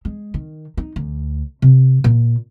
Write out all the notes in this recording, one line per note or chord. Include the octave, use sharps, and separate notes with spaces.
G#3
D#3
D#4
D2
C3
A#2